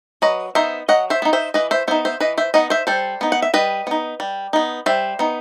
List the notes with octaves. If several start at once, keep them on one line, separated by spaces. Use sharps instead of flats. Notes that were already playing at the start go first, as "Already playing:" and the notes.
F#3 B4 D#5
B3 D#4 C5 E5
F#3 D#5 F#5
C5 E5
B3 D#4
C5 E5
E3 B4 D#5
C5 E5
B3 D#4 C5 E5
C5 E5
E3 B4 D#5
C5 E5
B3 D#4 D#5 F#5
C5 E5
G3 A4 C5
B3 D#4
F#5
E5
G3 B4 D#5
B3 D#4
G3
B3 D#4
G3 C5 E5
B3 D#4